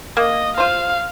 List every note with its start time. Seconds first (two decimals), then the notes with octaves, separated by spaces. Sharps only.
0.17 A#3 D#5
0.57 F4 C5 F5